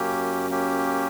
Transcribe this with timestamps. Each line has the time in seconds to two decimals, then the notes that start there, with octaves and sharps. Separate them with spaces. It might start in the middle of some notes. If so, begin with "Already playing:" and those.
Already playing: F#2 A#3 C#4 G4
0.50 A#3 C#4 G4